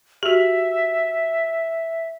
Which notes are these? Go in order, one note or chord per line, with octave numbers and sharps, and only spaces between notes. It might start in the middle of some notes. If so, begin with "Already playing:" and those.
F#4 G4 E5